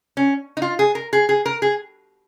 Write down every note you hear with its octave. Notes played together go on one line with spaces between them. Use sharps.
C#4
D#4
F4
G#4
A#4
G#4
G#4
A#4
G#4